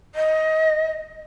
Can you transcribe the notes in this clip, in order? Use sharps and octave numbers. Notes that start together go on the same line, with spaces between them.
D#5